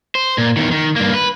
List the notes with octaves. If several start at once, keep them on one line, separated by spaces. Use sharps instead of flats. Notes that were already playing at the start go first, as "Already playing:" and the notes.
C5
A#2
E2 D#3
D#3
G2 A#3
B4